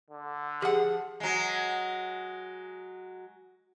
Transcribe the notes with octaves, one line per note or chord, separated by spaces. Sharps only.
D3
F3 G4 G#4 F#5
F#3 G#3